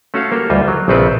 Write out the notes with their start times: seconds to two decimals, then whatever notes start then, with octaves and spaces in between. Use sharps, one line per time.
0.14 A3 C#4 F#4 A4 F5
0.32 A#3 G4 A4
0.50 D2 G3 F4 D#5 G#5
0.68 F#3 A#3
0.88 A#1 C#3 C4 A4 B4 D5